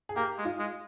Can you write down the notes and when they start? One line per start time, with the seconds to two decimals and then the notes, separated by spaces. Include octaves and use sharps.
0.09 G#4
0.16 A#3 G4
0.38 G#3
0.45 F4
0.59 G#3